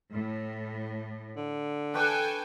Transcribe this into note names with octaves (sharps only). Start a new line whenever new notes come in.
A2
D3
D4 A4 B4 G5 G#5 C#6